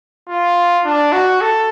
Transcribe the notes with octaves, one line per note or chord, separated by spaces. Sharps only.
F4
D4
F#4
A4